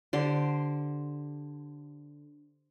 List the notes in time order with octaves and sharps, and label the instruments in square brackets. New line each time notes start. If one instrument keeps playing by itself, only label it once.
[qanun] D3 G4 C5